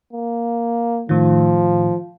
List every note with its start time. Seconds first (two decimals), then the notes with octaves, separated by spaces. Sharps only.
0.13 A#3
1.09 A2 D#3 F3